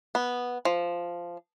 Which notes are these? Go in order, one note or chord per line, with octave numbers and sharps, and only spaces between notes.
B3
F3